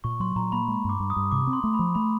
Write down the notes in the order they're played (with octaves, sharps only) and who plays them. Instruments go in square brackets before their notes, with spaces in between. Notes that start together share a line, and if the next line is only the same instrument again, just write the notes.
[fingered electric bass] A#2 [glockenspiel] C#6
[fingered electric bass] F#3 [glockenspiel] C6
[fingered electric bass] A#2 [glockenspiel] A#5
[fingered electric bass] A#3 [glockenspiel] B5
[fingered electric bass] G#3
[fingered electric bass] G2 [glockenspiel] D6
[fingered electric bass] G2
[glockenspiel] D#6
[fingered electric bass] G2
[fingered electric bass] C3 [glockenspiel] D6
[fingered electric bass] C4
[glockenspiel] C6
[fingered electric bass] A3
[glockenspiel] B5
[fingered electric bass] F3
[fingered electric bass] A3 [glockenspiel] B5